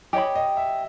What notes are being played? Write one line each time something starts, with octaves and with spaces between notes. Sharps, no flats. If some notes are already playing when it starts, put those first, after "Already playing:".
G4 C#5 D#5 G5 B5
D#5
E5